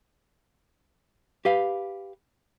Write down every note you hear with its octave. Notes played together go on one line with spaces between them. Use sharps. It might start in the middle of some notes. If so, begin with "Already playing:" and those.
G4 B4 F5